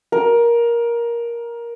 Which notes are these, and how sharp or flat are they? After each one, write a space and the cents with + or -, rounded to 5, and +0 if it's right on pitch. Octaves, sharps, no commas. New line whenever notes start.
A#4 +15